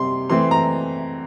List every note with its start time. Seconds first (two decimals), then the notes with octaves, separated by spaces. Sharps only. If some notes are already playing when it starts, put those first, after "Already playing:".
Already playing: C3 G3 C4 C6
0.30 E3 A3 C4 C6
0.51 A#5